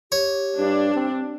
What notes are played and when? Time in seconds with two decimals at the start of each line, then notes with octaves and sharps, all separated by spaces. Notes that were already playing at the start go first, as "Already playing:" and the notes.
0.12 G4 C#5
0.59 G2 D4
0.95 C4